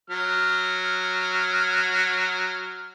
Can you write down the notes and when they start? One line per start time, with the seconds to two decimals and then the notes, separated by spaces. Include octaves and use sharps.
0.10 F#3 F6